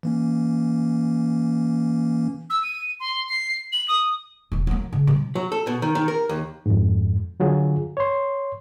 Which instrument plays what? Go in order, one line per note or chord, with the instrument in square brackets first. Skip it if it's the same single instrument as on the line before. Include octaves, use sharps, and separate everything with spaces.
[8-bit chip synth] E3 A#3 C#4
[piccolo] E6
D#7
C6
C7
F#7
D#6
[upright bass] E1 C2
F#3 A#3
C#3
C3 G3
[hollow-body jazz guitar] F#3
A4
B2
D#3
D#3
A#4
D#2
[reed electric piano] F2 G#2
D3 F#3 F4 G#4
C#5 C6